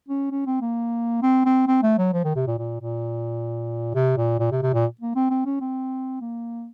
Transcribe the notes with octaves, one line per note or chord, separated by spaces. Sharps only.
C#4
C#4
C4
A#3
C4
C4
C4
A3
F#3
F3
D#3
C3
A#2
A#2
A#2
C3
A#2
A#2
C3
C3
A#2
A#3
C4
C4
C#4
C4
A#3